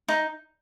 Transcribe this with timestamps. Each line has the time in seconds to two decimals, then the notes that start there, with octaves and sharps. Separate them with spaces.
0.08 D#4